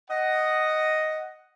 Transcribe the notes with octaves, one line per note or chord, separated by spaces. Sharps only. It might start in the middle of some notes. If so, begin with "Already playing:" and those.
D#5 F#5